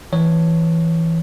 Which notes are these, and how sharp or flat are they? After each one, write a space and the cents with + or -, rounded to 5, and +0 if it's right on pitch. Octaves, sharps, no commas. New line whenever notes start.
E3 +0 C#5 +0